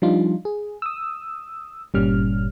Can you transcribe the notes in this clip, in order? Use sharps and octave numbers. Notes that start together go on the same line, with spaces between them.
F3 G3 D4 D#4 F4
G#4
D#6 E6
G1 A#2 G3 C#4 F6